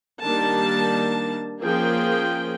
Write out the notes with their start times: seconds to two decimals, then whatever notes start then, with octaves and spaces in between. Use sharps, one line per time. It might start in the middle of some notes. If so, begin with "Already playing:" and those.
0.22 D#3 G3 A#3 D4 A5
1.61 F3 A#3 C#4 G#4 G5